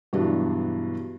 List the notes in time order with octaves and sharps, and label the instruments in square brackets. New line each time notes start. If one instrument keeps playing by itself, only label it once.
[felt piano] G2 B2 E3 F#3 D4